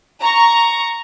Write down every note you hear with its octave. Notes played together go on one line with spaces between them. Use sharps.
A#5 C#6